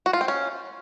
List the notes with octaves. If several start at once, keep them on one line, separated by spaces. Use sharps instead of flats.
F#4
F4
C4
C#4